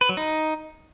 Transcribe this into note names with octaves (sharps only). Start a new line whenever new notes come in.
B4
F#3
D#4